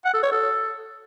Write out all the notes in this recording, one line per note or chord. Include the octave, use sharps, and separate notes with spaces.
F#5
A4
C#5
A4